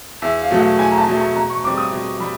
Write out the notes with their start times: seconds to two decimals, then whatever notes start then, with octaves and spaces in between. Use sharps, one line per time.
0.22 E2 E5
0.42 F5
0.51 B2 F#3 A3
0.59 F#5
0.78 E2 G#5
0.91 A#5
0.98 A5
1.07 B2 F#3 A3
1.17 A5
1.35 B2 A#5
1.50 C#6
1.64 G3 C4 D6
1.77 D#6
1.92 B2
2.20 G3 B5